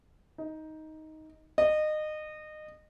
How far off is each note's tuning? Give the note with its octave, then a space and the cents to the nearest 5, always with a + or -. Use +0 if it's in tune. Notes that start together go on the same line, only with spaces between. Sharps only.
D#4 +10
D#5 -25